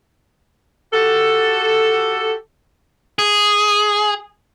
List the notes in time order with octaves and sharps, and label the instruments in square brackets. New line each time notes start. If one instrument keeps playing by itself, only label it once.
[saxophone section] F#4 G4 A4
[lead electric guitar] G#4